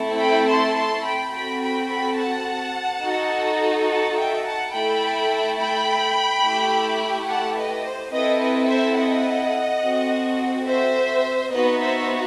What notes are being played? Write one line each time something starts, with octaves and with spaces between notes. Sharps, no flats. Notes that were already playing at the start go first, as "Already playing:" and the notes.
Already playing: A3 C4 E4
G5 B5
A5 C6
A5 C6
G5 B5
C4 F#4 A4 G5 B5
G5 B5
G5 B5
F#5 A5
D#4 F#4 A4
F#5 A5
E5 G5
F#5 A5
A3 E4 A4 G5 B5
G5 B5
A3 E4 G4
F#5 A5
B4 D#5
C5
C4 E4 A4 B4 D#5
B4 D#5
C5 E5
D#5 F#5
C4 F#4 A4
C5 E5
B3 D#4 F#4 B4 D#5
C5 E5